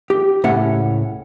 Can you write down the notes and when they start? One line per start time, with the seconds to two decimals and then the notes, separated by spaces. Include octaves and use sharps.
0.10 G4
0.44 C#2 A2 C#4 E5 F#5